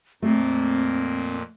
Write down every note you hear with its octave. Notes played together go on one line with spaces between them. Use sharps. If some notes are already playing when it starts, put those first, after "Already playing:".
F2 A#2 A3 A#3 C4